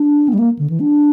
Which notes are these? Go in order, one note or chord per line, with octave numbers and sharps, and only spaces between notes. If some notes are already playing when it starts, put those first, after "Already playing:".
Already playing: D4
B3
G3
A#3
D3
E3
D4